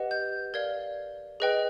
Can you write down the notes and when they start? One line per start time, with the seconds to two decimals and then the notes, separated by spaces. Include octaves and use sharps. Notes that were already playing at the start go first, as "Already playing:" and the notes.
Already playing: G4 B4 D#5 F#5
0.11 G6
0.54 A#4 D5 F5 G#6
1.40 G#4 B4 D#5 G5